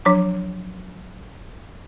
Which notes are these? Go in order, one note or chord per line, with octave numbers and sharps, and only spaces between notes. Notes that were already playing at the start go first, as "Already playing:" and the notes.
F3 F#3 D4 D6